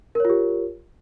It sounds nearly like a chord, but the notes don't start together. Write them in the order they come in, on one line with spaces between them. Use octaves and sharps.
A#4 C#5 F4 G4